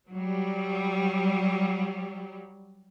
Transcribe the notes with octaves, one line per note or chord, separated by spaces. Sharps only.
F#3 G3